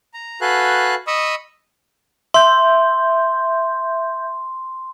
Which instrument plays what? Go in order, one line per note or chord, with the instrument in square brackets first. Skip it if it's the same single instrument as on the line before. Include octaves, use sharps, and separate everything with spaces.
[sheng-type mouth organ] A#5
F#4 A4 B4 F5 G#5 F#6
D#5 B5 C#6 D#6 E6
[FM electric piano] E5 G6 [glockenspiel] C6